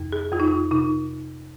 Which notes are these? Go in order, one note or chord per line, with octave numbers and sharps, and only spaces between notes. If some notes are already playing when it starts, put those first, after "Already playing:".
Already playing: F2 C3
G#4
F2 F4
D#4
F4
C3 D#4